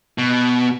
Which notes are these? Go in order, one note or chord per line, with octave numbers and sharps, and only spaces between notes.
B2